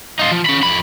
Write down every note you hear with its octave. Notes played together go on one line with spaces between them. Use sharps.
D#4 F4
F3
C#4 B5
F2 B5